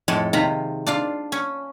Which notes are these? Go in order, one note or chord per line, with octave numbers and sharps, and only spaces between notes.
F2 A2 G#3 A4
C3 D#3 F4 A#5 B5
D4 F4 F5
C#4